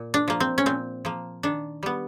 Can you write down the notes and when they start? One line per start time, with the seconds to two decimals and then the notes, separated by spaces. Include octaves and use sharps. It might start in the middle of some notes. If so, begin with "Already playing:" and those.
Already playing: A#2
0.14 D4
0.28 F3 A#3
0.40 C4
0.58 C#4
0.66 A#2 C4
1.05 F3 A#3
1.43 D#3 D4
1.83 G3 B3